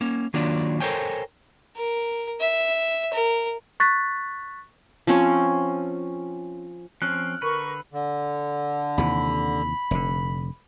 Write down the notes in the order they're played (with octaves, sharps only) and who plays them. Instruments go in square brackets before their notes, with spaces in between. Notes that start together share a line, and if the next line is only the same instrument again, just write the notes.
[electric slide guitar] A#3 C#4
D#3 F#3 A#3 D4 F4 D5
A4 A#4 C5 C#5 G5 G#5
[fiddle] A#4
E5
A#4
[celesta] C#6 F#6 A6 B6
[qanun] F3 C4 C#4 C#5
[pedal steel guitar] F3 C4 C#4 [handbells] F6 F#6
[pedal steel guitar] D3 B4 [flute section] A#4 C#6
[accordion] D3
[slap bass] D#2 C3 E3 [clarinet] B5
[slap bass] F1 D3